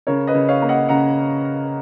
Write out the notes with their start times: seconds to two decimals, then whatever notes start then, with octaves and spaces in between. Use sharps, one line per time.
0.07 C#3 A#4 C#5
0.27 B4 D#5
0.35 C#3
0.48 C#5 F5
0.62 A#3
0.69 D#5 F#5
0.89 C#3 F#5 A#5